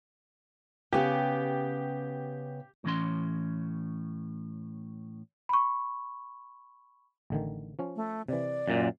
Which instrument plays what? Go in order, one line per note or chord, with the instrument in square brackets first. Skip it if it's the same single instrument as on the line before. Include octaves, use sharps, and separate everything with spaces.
[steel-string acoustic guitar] C#3 B3 [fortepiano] G4
[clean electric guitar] A2 E3 C#4 C6
[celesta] B5 C#6
[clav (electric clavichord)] A1 D3 D#3
F3 C#4
[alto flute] A3
[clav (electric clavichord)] C3 E3 [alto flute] D5
[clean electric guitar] F#2 A#2